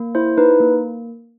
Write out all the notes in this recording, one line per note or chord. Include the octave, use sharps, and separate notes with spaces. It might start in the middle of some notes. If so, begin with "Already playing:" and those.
Already playing: A#3
E4 C5
D#4 B4
A#3